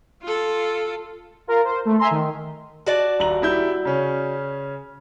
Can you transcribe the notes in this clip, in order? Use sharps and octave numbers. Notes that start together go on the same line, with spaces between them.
F4 A4
F4 A#4
C5
A3
E5 G#5 A#5 C6
D#3
F#4 D5 A5
D#1 A#5 F#7
G3 E4 G6
C#3 C#4